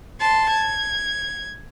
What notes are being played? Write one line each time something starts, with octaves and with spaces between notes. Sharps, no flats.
A5 C6
G#6